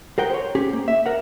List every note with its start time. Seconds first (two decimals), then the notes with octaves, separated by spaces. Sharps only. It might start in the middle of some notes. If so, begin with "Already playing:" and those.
0.18 G#4 A#4 F#5 G5
0.30 C5 C#5
0.55 C#4 G4 G#4
0.73 A#3
0.88 E5
1.06 A#4 F#5